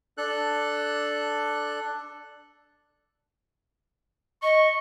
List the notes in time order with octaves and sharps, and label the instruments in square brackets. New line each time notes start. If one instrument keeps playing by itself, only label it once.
[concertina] D4 A4 F#6
[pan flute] D#5 [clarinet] C#6